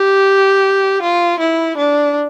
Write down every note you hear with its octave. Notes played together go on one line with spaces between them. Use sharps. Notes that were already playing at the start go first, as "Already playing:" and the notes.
Already playing: G4
F4
E4
D4